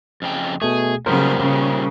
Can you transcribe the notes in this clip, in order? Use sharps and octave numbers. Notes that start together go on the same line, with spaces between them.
F2 C#3 G5
B2 A3 G#4
A#2 C#3 F#3 G3 B3 A#4 C5
C#3